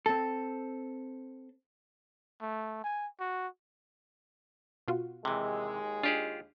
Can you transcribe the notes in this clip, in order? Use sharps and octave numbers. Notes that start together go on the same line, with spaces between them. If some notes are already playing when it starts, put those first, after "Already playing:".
C4 A4
A3
G#5
F#4
B2 F4 F#4
D#2 C3 E3 G#3
D4 F4 G4 G#4